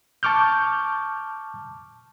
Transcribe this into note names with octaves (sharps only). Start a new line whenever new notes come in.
A5 C#6 D6 F6 G6